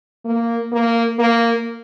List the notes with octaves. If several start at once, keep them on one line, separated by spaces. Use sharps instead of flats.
A#3
A#3
A#3